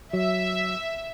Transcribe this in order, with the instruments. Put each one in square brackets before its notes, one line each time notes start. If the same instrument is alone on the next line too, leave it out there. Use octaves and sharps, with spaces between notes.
[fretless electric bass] F#3 [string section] E5